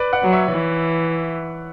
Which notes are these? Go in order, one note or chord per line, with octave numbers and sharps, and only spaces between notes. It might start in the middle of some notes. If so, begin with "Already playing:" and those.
Already playing: B4 D5
D5 F#5
F#3
C#5 E5
E3